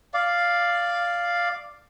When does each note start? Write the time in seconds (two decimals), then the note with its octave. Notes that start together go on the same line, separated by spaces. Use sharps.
0.14 D5 F5